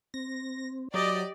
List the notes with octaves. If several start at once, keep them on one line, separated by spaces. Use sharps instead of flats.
C4 A#6
F#3 G4 D5 D#5